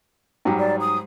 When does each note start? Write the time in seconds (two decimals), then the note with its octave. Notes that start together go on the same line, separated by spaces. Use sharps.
0.45 G#2 F#3 G3
0.59 D5
0.80 D#6